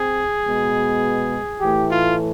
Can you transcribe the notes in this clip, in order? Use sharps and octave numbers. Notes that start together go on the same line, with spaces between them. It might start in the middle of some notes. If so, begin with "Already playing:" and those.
Already playing: C4 G#4
B2 G#3 B3
A2 E3 A3 G4
F4